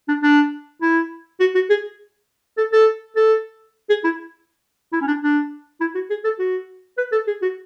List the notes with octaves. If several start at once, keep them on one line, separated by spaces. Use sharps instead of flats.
D4
D4
E4
F#4
F#4
G#4
A4
A4
A4
G#4
E4
E4
C#4
D4
D4
E4
F#4
G#4
A4
F#4
B4
A4
G#4
F#4